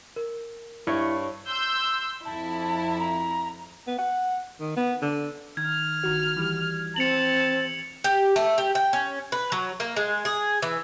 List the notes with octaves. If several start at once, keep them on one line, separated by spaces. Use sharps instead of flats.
A#4
G2 E4 C#5
C6 E6 G6
F2 E4 A5
A#5
B3
F#5
D#3
B3
D3
D#3 F6 G#6
G1 D#3 F#4
E3 G3
C4 A5 C#7 F7 F#7
G4
A3
G4
G5
C#4
B4
F#3
A#3
G#3
G#4
E3